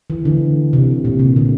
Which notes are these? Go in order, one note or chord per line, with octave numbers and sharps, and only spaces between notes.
E3
D3
C3
A#2
C3
D3